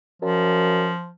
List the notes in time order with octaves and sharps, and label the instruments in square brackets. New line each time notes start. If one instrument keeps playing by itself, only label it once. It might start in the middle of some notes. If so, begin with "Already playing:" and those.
[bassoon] F#2 [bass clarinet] F3